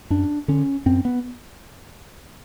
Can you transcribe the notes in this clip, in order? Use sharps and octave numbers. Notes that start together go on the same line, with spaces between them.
F#2 D4
D3 C#4
F#2 C4
B3